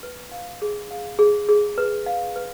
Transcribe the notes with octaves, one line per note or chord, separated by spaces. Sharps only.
B4
F5
G#4
F5
G#4
G#4
B4
F5
B4